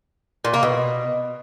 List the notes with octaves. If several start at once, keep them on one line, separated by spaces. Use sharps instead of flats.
A#2
A#3
B2